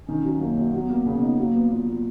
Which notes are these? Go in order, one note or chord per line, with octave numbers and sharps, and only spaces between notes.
D#3 C#4
F#3
F#2 A#3
F#2
F#3 B3
A#3
C#3 B3
D#4
F#3 A#3
B3
A#2
A#2